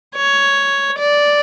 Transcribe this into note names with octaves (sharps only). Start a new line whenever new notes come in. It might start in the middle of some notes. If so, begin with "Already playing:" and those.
C#5
D5